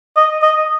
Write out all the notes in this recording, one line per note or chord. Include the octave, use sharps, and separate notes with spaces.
D#5
D#5